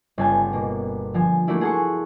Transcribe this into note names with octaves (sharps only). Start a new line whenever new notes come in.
G1 C#3 G#5 A5 G6
B2 A#3
D3 F3 G#5
A3 A#3 D4 E4 F#4
G#4 A4 F#5 A5 C6 C#6